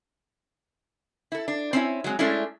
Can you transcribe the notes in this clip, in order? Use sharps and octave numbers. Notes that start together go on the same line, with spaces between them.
E4 A4
D4
C4 C#4 E4
F#3 G#3 C4
G#3 A3 C#4 D4 E4